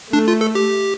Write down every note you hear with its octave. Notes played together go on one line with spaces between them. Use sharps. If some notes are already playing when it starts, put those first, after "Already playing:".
A3 D4
F4
A4
G4